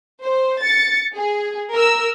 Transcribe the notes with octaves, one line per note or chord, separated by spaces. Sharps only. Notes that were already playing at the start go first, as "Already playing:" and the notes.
C5
A6 C#7
G#4
A#4 E6